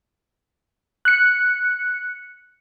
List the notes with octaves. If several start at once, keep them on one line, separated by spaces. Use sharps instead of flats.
F#6 C#7